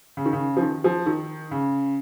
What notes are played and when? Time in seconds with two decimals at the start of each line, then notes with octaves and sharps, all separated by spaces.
0.17 C#3
0.26 D#3
0.33 C#3
0.57 F3
0.62 D#3
0.84 F3
1.06 D#3
1.51 C#3